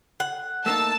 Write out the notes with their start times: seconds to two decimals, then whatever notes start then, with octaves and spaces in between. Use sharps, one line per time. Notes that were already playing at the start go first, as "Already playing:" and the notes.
0.20 F#5
0.66 A3 A#3 D#4 A5 E6